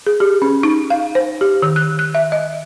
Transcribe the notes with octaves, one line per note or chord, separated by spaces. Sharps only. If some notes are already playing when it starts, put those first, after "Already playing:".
G#4
G4
C#4
D#4
F5
C5
G4
D#3
F#6
F#6
E5
D#5